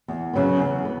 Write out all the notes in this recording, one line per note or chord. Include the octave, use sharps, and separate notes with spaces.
E2
C#3 F#3 B3
E2
B3